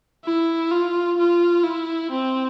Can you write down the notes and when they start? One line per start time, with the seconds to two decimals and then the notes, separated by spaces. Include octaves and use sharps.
0.25 E4
0.72 F4
1.18 F4
1.64 E4
2.11 C4